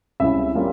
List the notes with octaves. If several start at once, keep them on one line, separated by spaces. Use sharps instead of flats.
C#2 C3 G3 C#4 E4 E5
G3 A#3 C#4 F4